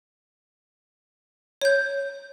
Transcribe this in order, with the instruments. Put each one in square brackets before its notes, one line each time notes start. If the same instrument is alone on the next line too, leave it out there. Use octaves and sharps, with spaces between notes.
[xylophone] C#5 G6